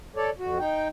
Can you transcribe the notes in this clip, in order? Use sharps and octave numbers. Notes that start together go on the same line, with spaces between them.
A4 C#5 D5
F2 F#4
D#4 G5